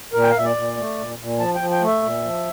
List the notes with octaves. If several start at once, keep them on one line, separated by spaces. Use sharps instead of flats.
A#2 A#4
G5
F5
A#2 E5
D5
A#2
A3
A#2
A#2
F3 A5
G5
F3
G5
A3
E5
A#2
F3